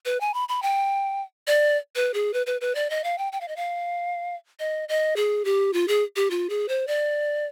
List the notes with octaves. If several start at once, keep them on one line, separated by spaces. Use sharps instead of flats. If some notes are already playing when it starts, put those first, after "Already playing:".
B4
G#5
B5
B5
G5
D5
B4
G#4
B4
B4
B4
D5
D#5
F5
G5
G5
F5
D#5
F5
D#5
D#5
G#4
G4
F4
G#4
G4
F4
G#4
C5
D5